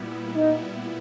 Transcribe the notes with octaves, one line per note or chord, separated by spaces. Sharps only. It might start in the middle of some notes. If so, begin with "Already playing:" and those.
Already playing: A#2 G3 B3 E4
D#4